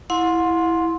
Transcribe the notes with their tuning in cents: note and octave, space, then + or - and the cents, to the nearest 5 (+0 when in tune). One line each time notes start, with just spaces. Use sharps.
E4 +0 F#5 -40 C6 +5